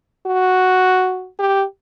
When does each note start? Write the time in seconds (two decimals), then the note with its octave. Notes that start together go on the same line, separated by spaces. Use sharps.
0.27 F#4
1.39 G4